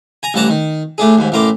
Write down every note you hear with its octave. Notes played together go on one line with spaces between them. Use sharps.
G#5 A#5
A1 G2 F#5 A5 A#5
D#3
A2 A3 D4 G#4
D#2 G#2
A1 A2 A#4 C6 D6